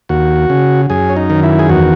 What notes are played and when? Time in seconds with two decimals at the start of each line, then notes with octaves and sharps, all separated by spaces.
0.09 D#2 F#4
0.50 C#3
0.90 F#2 G#4
1.10 C#4
1.16 D#4
1.30 D#3
1.43 E4
1.59 G#4
1.69 E2 F#4